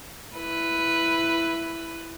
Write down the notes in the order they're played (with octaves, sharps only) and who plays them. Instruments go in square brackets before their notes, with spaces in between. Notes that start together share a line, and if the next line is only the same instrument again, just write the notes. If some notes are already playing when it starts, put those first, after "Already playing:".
[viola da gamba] E4 B4